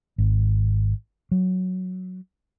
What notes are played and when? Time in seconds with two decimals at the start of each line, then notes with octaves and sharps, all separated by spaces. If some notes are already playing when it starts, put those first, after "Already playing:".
0.18 G#1
1.31 F#3